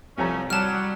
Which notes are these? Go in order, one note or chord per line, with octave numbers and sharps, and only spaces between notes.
C2 F3 A3 C#4 G#5 A#5
F#3 G3 A5 F6